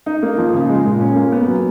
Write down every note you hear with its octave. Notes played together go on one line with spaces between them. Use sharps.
D#4
A#3
F3
C#3
G#3
A#2
C#4
A#3
B3
F#3